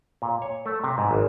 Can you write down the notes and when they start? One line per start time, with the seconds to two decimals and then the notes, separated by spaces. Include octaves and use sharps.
0.22 A#2
0.42 C#5
0.66 A3
0.84 C3
0.98 G#2
1.11 G#1